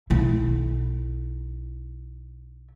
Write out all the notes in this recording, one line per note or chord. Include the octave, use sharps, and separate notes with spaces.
B1 E4